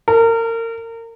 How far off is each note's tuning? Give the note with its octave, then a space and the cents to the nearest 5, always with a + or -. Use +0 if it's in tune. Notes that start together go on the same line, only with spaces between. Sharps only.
A#4 -30